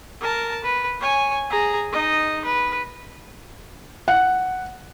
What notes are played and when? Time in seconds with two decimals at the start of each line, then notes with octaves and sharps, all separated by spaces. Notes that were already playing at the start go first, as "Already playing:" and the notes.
0.21 A#4 A5
0.64 B4
1.00 C#5 G#5
1.50 G#4 A#5
1.92 D#4 D#5
2.45 B4
4.08 F#5